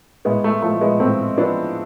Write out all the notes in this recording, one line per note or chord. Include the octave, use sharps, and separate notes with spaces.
A2 G#3 B3
A3
F3 A3
G#3 B3
A2 A3 C4
F3 B3 D4